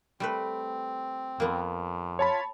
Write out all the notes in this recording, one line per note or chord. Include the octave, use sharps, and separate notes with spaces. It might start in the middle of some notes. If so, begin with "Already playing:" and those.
G3 A3 C4 B4
F2 A#3 B3
F4 C#5 A5 B5